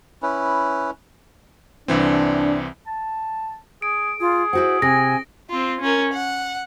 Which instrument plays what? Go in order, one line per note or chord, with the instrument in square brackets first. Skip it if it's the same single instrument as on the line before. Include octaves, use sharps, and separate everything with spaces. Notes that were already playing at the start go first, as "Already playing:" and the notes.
[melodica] C#4 E4 B4
[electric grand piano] C2 E3 C4 [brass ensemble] D4
[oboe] A5
[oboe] G#4 [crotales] D7
[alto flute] F4 [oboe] G#4
[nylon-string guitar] E4 F#4 F#5 [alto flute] C5
[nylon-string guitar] C3 [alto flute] G#5 [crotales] A#6
[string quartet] C4 F4
C#4 A#4
F#5